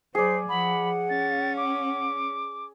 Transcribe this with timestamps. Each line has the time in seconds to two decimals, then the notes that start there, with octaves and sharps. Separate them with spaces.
0.15 F#3 G#4 C5 D5 C7
0.49 F3 F#5 B5
1.10 C#4 A6
1.57 D6